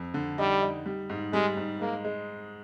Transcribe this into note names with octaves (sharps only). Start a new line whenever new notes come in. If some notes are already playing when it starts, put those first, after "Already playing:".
Already playing: F2
D3
G3 D#4
D#4
G3
G#2
G3 G#3
G#2
G#3 A#3
G#3